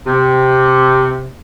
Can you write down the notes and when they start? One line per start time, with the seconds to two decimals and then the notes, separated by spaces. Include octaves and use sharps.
0.07 C3